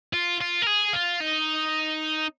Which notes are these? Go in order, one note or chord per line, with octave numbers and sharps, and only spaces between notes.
F4
F4
A#4
G#4
F4
D#4